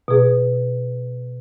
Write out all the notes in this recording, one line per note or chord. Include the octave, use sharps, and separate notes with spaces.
B2 G#4